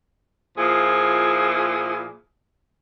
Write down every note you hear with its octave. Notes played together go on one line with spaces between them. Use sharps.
A#2 F3 E4 G#4